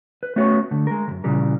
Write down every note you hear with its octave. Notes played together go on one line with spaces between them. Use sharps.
B4
A3 B3 C#4 F#4 C#5
D3 A3
G#3 A#4
C#2 F#2
A#2 C#3 E3 G3 A#4